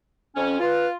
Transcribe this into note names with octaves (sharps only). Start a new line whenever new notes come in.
F2 C#4
F4 B4